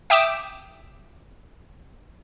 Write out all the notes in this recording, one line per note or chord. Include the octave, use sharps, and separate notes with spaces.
E5 G5 D6 D#6 E7